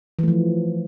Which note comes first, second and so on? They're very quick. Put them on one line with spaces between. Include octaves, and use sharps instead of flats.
E3 A3 F3